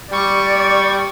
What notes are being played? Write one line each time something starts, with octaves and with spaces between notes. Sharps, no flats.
G3 D5 C#6